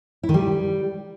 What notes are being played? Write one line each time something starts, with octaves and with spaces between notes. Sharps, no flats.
E4
D#3
G3